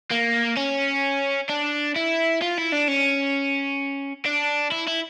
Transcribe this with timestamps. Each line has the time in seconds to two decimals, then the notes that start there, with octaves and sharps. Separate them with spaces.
0.11 A#3
0.57 C#4
1.50 D4
1.96 E4
2.41 F4
2.57 E4
2.72 D4
2.88 C#4
4.26 D4
4.72 E4
4.87 E4